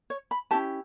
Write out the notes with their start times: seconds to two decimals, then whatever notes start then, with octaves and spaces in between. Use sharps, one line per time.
0.10 C#5
0.31 B5
0.51 C#4 E4 G4 A5